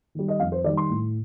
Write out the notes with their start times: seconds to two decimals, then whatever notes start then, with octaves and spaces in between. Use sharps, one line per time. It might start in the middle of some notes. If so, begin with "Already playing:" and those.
0.15 D#3 G3
0.28 D#5
0.39 F2 F5
0.52 C5
0.64 D#3 G3 D5
0.77 C6
0.90 A2